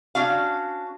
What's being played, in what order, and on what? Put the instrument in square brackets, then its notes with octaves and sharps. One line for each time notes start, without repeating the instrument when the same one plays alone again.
[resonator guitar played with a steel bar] C#4 D4 F#4 F5